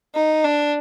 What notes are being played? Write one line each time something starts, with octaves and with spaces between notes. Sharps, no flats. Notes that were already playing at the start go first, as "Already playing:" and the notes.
D#4
D4